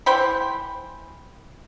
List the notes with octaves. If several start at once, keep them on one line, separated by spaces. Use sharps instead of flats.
E3 C5 G5 B5